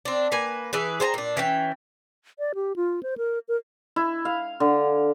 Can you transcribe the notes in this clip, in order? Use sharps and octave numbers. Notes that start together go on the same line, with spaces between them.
C4 D4
A#3 B4 G#5
E3 G#4 B4
G#4 C5 G#5 A#5
A#2 D4
E3 C#4 G5
D5
G4
F4
C5
A#4
A#4
E4
F5
D3